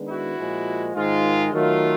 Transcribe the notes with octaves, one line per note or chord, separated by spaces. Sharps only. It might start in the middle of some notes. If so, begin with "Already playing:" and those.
Already playing: D#3 G#3 B3 D4
E4 F#4
A#2 F3 G#3
G#2 D#3 G#3 F4
D#3 F#3 A3 F4